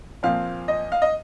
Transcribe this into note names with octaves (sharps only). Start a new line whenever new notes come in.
A#2 F3 C4 F5
D#5
F5
D#5